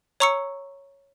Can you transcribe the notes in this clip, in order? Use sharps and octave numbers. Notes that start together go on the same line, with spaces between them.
C#5 A#5 C#6 E6 C#7